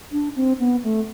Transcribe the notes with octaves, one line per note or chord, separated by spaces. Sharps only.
D4
C4
B3
A3